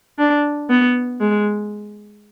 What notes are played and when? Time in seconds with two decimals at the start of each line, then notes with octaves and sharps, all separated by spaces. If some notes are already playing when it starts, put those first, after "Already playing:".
0.18 D4
0.70 B3
1.20 G#3